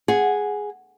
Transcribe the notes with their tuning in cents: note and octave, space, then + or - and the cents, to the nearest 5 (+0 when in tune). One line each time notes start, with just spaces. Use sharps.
G#4 +0 F#5 +0